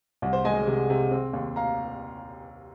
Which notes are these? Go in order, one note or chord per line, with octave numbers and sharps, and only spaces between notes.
C2
C5
G#3 D#5 G#5
C3
C3
C4
D#2
F5 A#5